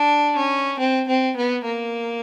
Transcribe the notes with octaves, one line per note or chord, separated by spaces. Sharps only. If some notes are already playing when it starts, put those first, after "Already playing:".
Already playing: D4
C#4
C4
C4
B3
A#3